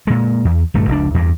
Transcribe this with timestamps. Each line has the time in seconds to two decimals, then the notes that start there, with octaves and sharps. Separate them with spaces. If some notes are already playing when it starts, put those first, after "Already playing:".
0.07 A#2 G#3
0.45 E2
0.74 D1 G2 A3
0.89 F1 C#2 D4
1.14 E2 G2